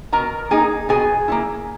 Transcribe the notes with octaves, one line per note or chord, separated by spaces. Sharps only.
B2 A#4 A#5
A#3 D#4 G#4 G#5
B2 G#4 G#5
A#3 C#4 E4